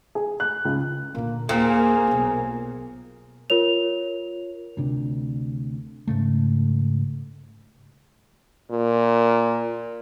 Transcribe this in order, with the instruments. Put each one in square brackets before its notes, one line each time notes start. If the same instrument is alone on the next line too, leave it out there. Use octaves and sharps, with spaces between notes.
[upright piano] G#4
F#6
C#2
[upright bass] A#2 D3 [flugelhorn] A#3
[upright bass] D#2 [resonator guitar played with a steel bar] A#2 C4 [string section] A#3 [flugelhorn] G#4
[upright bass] B1 B3
[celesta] F4 A#4 C#5 F7
[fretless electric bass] D2 C3 D4
G#2 C#3 A3
[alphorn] A#2